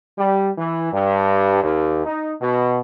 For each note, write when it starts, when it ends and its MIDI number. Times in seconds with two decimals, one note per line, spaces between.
0.19 0.50 55
0.58 0.89 52
0.92 1.59 43
1.63 2.03 39
2.05 2.33 63
2.41 2.80 47